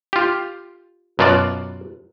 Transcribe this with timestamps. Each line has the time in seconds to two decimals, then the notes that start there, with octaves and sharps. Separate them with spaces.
0.13 F4 G4
1.19 F#2 B2 F4 F#4 D5